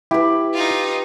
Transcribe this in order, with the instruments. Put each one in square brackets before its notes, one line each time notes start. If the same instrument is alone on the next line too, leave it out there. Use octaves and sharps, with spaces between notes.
[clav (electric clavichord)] E4 [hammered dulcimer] G4 B4
[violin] D#4 F4